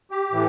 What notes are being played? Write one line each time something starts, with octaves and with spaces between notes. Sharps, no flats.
G4
A2 E3